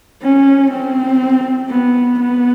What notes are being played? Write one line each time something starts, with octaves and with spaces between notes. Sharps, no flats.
C#4
C4
B3
B3